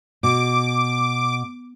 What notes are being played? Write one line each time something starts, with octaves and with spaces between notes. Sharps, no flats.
B2 D6